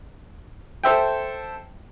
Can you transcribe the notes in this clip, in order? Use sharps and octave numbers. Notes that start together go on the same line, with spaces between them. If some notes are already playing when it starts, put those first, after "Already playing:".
A4 C5 E5 G5